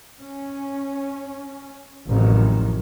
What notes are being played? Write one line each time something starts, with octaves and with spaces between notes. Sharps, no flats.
C#4
A1 F2 C3 D#3 F3 F#3